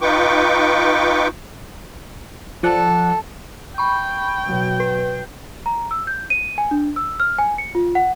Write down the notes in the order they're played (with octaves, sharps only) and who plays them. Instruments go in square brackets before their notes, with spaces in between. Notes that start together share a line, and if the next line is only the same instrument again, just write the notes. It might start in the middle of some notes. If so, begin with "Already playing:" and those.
[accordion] D#4 F4 B4 G5 C#6 D6
[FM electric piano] F3 D5 F#5 [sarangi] A4
[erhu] G5 [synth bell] B5 C#6
[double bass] B2 F#3
[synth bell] B4
[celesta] A#5
E6
G6
D#7
G#5
D4
E6
F6
G#5
C#7
F4
F#5